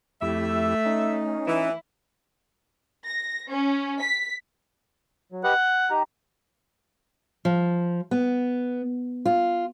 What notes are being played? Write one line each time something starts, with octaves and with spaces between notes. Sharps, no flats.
F2 A3 E4 G4 E5
C#4 D#4
E3 E4
A#6
C#4
B6
F#3
G4 B4 D#5 F#5
G6
D#4 G4 A#5
F3
B3
F4